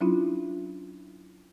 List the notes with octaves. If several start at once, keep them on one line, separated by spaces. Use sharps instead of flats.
F#3 C#4 D4 E4 F4